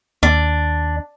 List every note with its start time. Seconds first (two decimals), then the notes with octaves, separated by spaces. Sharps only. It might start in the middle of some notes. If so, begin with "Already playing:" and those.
0.23 D#2 D4